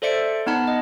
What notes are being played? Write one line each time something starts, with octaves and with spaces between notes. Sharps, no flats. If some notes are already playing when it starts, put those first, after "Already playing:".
A4 C5 D5 E5 C#7 D7
B3 D#4 F#5 A5 B5
D#5